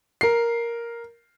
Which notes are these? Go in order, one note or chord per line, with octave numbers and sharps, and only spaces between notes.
A#4 C7